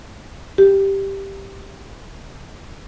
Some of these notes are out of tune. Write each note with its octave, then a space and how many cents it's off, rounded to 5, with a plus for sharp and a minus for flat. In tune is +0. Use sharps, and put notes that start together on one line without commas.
G4 +0